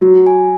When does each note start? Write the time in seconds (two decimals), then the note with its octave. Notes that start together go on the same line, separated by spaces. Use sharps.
0.01 F#3 F#4
0.27 G#5